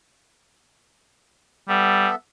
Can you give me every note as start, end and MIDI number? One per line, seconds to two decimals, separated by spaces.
1.69 2.08 55
1.69 2.15 59
1.69 2.15 69
1.69 2.15 76